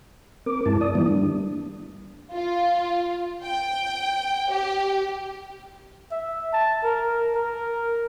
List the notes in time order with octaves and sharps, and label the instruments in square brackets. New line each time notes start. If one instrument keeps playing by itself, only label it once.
[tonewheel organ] C4 A#4 D6
G2 G#3 E4 A5
D5 D#6
D#3 E3 G3 A#3 B3 E4
G3 D4
[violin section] F4
G5
G4
[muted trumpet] E5
A5
A#4
A#4